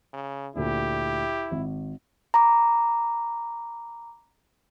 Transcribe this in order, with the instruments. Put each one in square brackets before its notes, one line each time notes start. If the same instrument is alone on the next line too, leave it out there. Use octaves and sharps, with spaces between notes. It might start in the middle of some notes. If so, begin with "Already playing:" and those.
[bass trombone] C#3
[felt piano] D2 A#2 D4 [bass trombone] E4 [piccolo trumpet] G4
[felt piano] G#1
[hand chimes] A#5 B5 D6